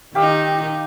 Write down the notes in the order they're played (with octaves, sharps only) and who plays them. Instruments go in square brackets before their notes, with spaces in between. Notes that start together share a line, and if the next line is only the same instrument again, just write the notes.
[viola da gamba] D#3 D#4 [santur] G4 F5 E6